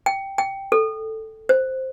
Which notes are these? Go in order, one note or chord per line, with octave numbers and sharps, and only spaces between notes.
G5
G5
A4
C5